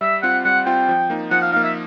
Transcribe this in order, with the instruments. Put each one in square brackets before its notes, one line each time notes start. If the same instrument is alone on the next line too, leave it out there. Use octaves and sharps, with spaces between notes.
[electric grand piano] G3 [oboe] E5
[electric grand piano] C4 F4 [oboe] F#5
[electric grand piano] G3 [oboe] F#5
[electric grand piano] C4 F4 [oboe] G5
[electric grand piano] F3
A#3 D#4
[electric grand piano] F3 [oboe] F#5
[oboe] F5
[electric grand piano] D#4 [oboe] F5
[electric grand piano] A#3
[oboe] E5